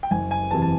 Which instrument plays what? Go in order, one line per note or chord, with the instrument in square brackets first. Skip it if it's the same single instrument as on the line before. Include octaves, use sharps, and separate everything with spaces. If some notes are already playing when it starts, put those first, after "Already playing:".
[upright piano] G5
F#1 G#5
G#5
E2 C3 E3 A5
A5